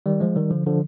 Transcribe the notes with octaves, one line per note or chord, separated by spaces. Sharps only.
D#3 G3
F3 G#3
D#3 G3
D3 F3
D3 F3